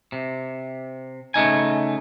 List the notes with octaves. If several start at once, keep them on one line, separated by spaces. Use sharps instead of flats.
C3
C#3 A3 D#4 G#5